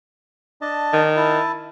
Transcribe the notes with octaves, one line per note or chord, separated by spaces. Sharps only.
D4 D#5 A5
D#3
E4 A5